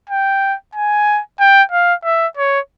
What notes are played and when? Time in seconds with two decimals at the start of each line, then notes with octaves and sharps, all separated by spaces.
0.10 G5
0.75 G#5
1.40 G5
1.71 F5
2.04 E5
2.37 C#5